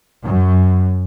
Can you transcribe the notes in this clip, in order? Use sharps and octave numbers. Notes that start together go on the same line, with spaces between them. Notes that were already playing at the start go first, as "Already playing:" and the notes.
F#2